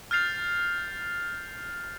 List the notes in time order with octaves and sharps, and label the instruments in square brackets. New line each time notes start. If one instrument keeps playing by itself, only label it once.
[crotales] F6 G6 A6 C7 F7